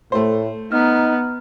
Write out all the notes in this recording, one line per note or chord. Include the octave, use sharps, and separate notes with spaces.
A2 A3 C5
B3 D#4 A#5 F6